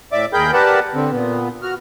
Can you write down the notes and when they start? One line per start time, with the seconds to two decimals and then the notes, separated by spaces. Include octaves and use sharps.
0.12 A2 D5 E5 D6
0.33 D#2 G#4 A#4 G5 B5 G6
0.53 G4 A#4 B4 D5 F#5 A5
0.94 D3 C4
1.11 A#2 B3
1.63 F#4 F6